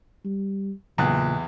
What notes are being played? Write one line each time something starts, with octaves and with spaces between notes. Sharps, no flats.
G3
B1 E2 A#2 C#3 G#5 F#6